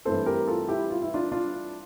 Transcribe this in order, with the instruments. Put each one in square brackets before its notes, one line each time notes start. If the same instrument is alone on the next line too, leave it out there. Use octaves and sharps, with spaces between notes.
[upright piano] G2 E3 A3 C4 A4 C5
G4 A#4
F4 A4
E4 G4
F4
E4
D4 F4
D4 F4